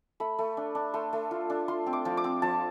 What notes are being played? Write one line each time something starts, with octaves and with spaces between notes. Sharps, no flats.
A3 B5
A3
D4
D4
A3 C6
A3
F4
D4
F4 C6
C4
D6
F3
D6
C4
F3 A5